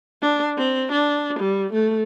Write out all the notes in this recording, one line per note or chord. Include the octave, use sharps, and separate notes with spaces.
D4
C4
D4
G3
A3